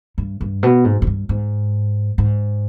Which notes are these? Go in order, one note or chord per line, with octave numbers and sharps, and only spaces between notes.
G2
G2
B2
G#2
G#2
G2
G#2
G#2